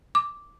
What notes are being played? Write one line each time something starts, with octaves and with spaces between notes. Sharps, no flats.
D6